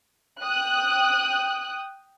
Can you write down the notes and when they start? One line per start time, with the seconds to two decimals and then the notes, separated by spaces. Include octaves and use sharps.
0.41 G5 D#6 F#6